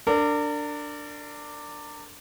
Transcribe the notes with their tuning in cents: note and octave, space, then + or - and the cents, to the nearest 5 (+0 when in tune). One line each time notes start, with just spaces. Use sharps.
D4 +0 A#4 -35